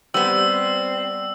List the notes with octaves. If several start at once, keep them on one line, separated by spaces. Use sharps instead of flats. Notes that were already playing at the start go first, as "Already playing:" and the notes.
G3 B3 C4 E6